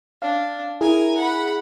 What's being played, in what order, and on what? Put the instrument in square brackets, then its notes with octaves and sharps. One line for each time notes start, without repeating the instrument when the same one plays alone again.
[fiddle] D4 [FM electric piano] F5
[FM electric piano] E4 G#4 [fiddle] A#4 G#5
[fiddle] F#5 B5